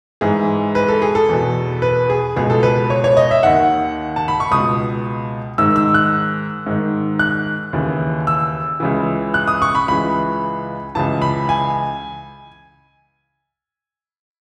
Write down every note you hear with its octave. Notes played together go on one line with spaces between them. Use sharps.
G#2 E3 G#4
B4
A4
G#4
A4
E2 B2
B4
G#4
C#2 B2 G#4
A4
B4
C#5
C#5
D#5
E5
D#2 D#3 F#5
A5
B5
C#6
C#2 B2 D#6
G#2 D#3 E6
E6
F#6
G#2 D#3
F#6
D#2 C#3 E3
E6
C#2 C#3 E3
F#6
D#6
C#6
B5
C#2 C#3 E3 B5
C#2 C#3 E3 A5
B5
G#5